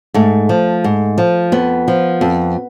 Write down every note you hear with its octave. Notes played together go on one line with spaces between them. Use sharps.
G#2 A3
F3
G#2
F3
F2 B3
F3
F2